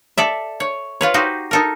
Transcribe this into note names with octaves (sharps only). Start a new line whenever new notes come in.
A4 D5 E5
C#5
F4 B4 C#5
D#4 F#4 G4 C5
D#4 A4 A#4